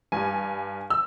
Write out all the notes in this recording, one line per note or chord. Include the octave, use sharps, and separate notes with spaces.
G2 G3 G#5
E6